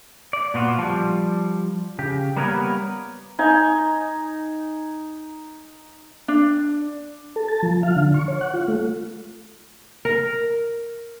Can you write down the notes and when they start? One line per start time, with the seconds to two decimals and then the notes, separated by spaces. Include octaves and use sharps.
0.33 D5
0.54 A#2 B3 F4 F#4
0.79 F3 G3
1.99 C#3 G4
2.36 G3 A#3 B3 A#4 B4 C#5
3.39 D#4 G#5
6.28 D4
7.36 A4
7.48 A5
7.63 F3
7.83 F5
7.96 D3
8.14 C#6
8.28 C#5
8.41 F#5
8.54 F4
8.68 A3
10.05 A#4